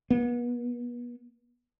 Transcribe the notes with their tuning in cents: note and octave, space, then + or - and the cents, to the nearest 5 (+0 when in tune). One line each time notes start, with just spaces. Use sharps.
B3 -35